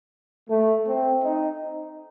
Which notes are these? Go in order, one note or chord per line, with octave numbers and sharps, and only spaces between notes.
A3
C4
D#4